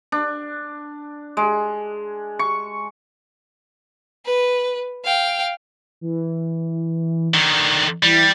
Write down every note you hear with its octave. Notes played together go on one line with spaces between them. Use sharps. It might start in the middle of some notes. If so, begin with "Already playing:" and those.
D4
G#3
C#6
B4
F5 G5
E3
D3 D#3
E3 G3